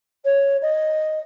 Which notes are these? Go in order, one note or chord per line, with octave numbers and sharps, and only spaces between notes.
C#5
D#5